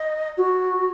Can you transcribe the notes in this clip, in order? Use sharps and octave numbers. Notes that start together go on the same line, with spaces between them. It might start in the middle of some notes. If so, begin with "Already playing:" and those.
Already playing: D#5
F#4